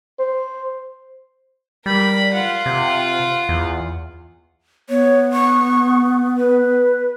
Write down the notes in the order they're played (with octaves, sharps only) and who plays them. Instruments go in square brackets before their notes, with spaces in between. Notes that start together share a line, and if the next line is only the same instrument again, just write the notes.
[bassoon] C5
[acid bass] G3 [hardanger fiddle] A#4 B5
[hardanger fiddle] F4 F#5
[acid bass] C3
E2
[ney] B3 [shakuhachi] C#5
[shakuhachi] C#6
B4